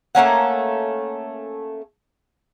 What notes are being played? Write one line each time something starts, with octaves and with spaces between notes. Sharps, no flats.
A3 A#3 C#4 F#5